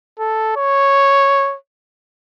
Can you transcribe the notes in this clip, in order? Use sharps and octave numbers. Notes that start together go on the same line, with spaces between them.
A4
C#5